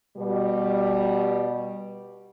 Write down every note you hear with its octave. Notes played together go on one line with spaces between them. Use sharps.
B2 G3